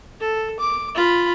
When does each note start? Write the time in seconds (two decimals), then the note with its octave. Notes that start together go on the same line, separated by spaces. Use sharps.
0.21 A4
0.60 D6
0.95 F4 B5